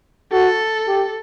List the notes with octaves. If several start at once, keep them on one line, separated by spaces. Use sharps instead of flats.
F#4 A4
G4